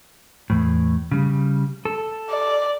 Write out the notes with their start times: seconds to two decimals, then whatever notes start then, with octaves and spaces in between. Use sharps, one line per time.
0.50 E2 A2
1.11 C#3 G3
1.85 A4
2.30 D5